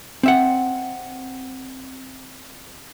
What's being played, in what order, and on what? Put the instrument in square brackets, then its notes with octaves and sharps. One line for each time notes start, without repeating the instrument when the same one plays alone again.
[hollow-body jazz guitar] C4 E5 F#5